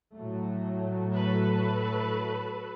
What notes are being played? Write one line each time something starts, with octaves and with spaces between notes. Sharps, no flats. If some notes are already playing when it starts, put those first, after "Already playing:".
A2 F#3 A3
F#4 A4 B4